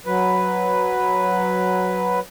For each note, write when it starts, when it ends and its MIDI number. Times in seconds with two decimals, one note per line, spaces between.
0.06 2.19 54
0.06 2.19 71